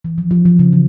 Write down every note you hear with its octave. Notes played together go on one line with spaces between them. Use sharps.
E3
F3
F3
F3
C#3
E3